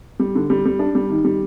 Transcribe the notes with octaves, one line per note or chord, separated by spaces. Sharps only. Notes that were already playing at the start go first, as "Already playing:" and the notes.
G3
D3
G3
G3
D4
G3
D#3
G3